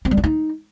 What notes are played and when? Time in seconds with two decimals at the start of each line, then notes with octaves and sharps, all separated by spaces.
0.05 C4
0.11 G3
0.17 D4
0.24 D#4